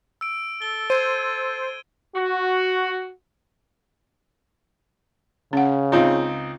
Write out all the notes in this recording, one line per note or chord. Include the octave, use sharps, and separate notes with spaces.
E6 D7
A4 G7
C5 G#6 D#7
F#4
C#3 C#4 F#5
C#2 C4 D#4 F4